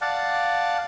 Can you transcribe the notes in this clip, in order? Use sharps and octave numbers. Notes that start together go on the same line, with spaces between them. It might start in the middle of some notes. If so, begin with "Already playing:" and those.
D5 F5 F#5 A5